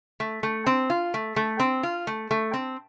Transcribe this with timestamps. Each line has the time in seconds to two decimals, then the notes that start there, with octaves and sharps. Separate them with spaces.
0.20 A3
0.43 A3
0.67 C4
0.90 F4
1.14 A3
1.36 A3
1.59 C4
1.83 F4
2.07 A3
2.31 A3
2.53 C4